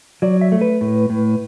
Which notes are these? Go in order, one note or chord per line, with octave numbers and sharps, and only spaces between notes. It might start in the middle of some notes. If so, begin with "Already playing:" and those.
F#3 D5
E5
A3
B4
A2
A2